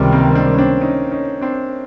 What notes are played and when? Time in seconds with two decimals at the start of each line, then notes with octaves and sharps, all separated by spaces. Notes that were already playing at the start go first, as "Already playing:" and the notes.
Already playing: C#2 C3 D#3 G3
0.12 A#3 C4
0.35 C4 D4
0.53 C#4
0.58 C4 D4
0.81 C#4 D#4
1.11 C#4 D#4
1.41 C4 D4